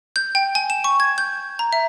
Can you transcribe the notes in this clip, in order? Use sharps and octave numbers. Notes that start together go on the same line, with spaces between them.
G6
G5
G#5
E7
C#6
G#6
G6
A#5
E5